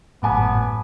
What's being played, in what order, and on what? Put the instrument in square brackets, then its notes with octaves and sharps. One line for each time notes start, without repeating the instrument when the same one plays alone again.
[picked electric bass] G#1 F#2 A2 [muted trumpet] B3 [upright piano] G#5 A5 D6